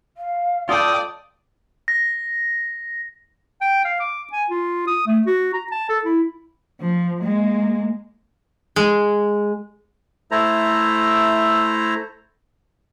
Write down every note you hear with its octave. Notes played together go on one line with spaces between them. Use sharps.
F5
F4 A4 D5 G5 A5 D#6
A#6
G5
F5
D6
G#5
F4
D#6
A3
F#4
A#5
A5
A4
E4
F3
G#3 A#3
G#3
A3 E4 A4 C5 A#5